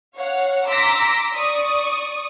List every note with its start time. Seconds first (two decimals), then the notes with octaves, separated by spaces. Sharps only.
0.16 C#5 F5 F#5
0.67 A#5 C6 D6 E6 A#6 B6
1.35 D5 C#6 D#6